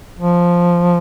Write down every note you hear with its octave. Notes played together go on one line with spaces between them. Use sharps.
F3